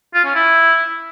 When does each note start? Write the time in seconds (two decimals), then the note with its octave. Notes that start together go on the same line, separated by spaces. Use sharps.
0.15 F4
0.25 C#4
0.35 E4